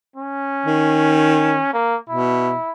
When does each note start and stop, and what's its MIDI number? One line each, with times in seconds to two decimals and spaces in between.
0.16 1.69 61
0.66 1.60 51
1.73 1.96 58
2.09 2.56 47
2.09 2.71 64